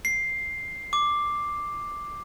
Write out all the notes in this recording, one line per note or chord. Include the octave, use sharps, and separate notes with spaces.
C7
D6